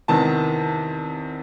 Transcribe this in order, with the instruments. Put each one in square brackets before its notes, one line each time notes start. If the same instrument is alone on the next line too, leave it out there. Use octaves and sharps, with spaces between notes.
[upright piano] E2 C3 D#3 A5